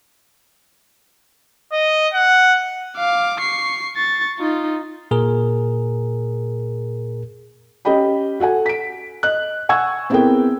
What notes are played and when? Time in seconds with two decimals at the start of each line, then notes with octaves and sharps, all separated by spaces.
1.72 D#5
2.14 F#5
2.97 F5 D6
3.40 C#6 C7
3.96 C#6 A6
4.39 D#4 F4
5.11 A#2 G#4 A#4
7.85 C#4 G4 D#5 G5 B5
8.40 F#4 A4 F#5 G#5
8.66 B6 D7
9.23 D#5 F#6
9.69 F#5 G#5 C#6 E6 G#6
10.10 B3 C4 E4 G#4 A#4 G5